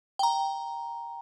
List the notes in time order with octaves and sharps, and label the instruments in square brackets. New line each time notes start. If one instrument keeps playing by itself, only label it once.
[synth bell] G5 A#5